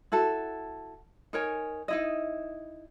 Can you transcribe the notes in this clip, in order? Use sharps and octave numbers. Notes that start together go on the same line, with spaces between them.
E4 F#4 A4 A5
D#4 A#4 C#5 G#5
D#4 E4 D#5